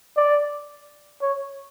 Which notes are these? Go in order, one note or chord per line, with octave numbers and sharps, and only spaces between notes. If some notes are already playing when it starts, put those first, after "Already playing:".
D5
C#5